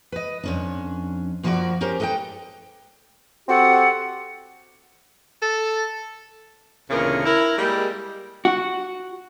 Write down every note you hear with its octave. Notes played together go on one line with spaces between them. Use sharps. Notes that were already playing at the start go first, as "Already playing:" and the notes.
B4 D#5
F2 C#4 D4
F#2 F3 A#3 F4 F#4 D5
C#4 G4 A#4 C5
A4 B4 D#5 F5 G5
C4 F#4 G4 A4 F#5
A4
D2 A#2 C#3 E3 B3 A#4
E4 A#4
G3 G#3 A#3
F#4